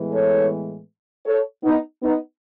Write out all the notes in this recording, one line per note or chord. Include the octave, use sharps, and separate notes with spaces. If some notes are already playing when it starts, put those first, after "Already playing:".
Already playing: A2 E3 G#3 B3
A4 C#5
A4 C#5
B3 D#4
B3 D#4